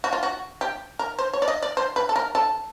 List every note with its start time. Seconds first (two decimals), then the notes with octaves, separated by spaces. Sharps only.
0.04 F#4
0.13 F4
0.23 F#4
0.61 G4
0.99 A#4
1.19 C5
1.33 C#5
1.42 D5
1.48 D#5
1.63 D5
1.77 C5
1.96 B4
2.09 A4
2.16 A#4
2.35 A4